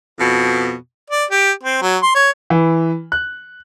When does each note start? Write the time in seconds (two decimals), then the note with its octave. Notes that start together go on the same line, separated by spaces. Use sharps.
0.19 F2 B2
1.10 D5
1.31 G4
1.63 C4
1.82 F#3
2.03 C6
2.15 C#5
2.50 E3
3.12 F#6